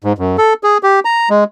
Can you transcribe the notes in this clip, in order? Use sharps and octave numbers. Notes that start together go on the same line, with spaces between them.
G#2
F#2
A4
G#4
G4
A#5
G#3